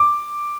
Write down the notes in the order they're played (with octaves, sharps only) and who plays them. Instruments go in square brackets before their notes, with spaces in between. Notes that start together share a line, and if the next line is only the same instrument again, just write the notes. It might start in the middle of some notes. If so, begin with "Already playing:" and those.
Already playing: [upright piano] D6